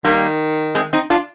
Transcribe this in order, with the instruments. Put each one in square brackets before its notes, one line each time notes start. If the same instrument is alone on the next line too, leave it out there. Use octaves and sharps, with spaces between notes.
[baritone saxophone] D#3 [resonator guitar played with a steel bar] G3 A#3
[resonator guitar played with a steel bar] G#3 C4
C4 D#4
D4 F4